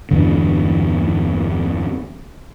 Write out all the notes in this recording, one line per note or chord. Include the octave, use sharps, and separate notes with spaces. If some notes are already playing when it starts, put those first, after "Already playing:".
E2 G2 D3